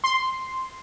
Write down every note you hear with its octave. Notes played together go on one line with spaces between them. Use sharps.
C6